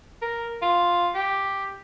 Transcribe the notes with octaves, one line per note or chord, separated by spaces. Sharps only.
A#4
F4
G4